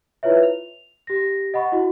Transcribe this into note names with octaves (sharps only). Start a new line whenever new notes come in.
E4 F4 B4 C#5 E5
F7
G4 A#6
D#5 F#5 B5 C#6
E4 F#4